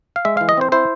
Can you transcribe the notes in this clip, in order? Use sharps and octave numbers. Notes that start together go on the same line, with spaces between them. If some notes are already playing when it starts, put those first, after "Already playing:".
F5
G#3 E5
E3 F5
D#5
C4 C5
E4 C5